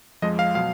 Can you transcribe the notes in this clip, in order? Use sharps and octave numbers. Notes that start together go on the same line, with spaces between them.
F2 F3 G#3 D#5
F5
B2 F#3 F5